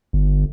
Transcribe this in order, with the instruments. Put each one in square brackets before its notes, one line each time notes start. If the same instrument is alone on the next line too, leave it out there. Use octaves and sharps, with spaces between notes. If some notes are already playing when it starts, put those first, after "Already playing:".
[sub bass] G1